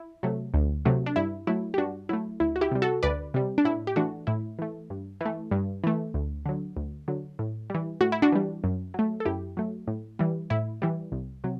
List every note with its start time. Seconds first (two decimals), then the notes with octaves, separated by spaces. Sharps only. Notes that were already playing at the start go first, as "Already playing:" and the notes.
Already playing: E4
0.23 C3 F#3 A3
0.54 D2
0.85 C3 F#3 A3
1.06 D4
1.16 G2 E4
1.47 F#3 A3 E4
1.74 G4
1.78 G2 D4 F#4
2.09 F#3 A3 E4
2.40 D2 E4
2.56 F#4
2.61 E4 G4
2.72 C3 G3
2.82 F#4 A4
3.03 D2 B4 D5
3.34 C3 G3
3.58 D4
3.65 A2 E4
3.87 G4
3.96 E3 A3 D4 F#4
4.27 A2 E4
4.59 E3 A3
4.90 G2
5.21 E3 A3
5.51 G2
5.84 E3 A3
6.14 D2
6.46 D3 F#3
6.77 D2
7.08 D3 F#3
7.39 A2
7.70 E3 G3
8.01 A2 F#4
8.12 E4
8.22 D4 F#4
8.32 E3 G3
8.64 F#2
8.94 F#3 A3
9.20 A4
9.25 F#2 E4 G4
9.57 F#3 A3
9.87 A2
10.19 E3 G3
10.50 A2 E4
10.82 E3 G3
11.12 C2
11.44 C3 F#3